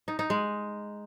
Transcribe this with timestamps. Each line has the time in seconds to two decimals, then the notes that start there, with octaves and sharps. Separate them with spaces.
0.08 D#4
0.19 D#4
0.30 G#3